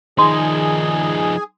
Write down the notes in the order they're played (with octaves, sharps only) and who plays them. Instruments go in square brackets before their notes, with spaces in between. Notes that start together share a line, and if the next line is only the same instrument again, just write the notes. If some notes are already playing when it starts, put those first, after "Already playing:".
[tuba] D#3 [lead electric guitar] F3 D#4 [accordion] G#4 [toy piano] C6